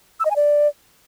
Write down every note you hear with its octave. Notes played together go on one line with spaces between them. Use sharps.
E6
D#5
G#5
D5